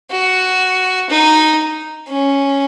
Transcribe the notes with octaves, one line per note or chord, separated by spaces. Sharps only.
F#4
D#4
C#4